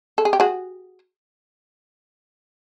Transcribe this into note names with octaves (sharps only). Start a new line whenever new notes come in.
A4
G#4
G4
F#4 G#4